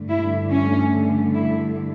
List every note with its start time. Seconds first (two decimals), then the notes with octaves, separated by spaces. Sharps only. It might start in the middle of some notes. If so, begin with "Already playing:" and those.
Already playing: G2 D3 A3
0.09 E4
0.50 C#4
1.34 E4